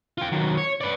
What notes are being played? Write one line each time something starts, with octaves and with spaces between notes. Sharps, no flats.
F4 G5
D#3 F#3
C#5
B4 D5